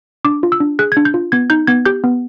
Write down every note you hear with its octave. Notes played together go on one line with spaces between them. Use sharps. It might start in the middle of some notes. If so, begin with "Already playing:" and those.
D4 D6
F4
E6
D4
G#4 F#6
G#6
D4
G6
F4
B3 G#6
D#4 G6
B3 G#6
G4 G6
B3